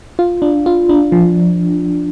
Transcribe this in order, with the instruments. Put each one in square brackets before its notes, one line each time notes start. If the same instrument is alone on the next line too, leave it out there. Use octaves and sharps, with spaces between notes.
[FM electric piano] F4
D4
F4
D4
F3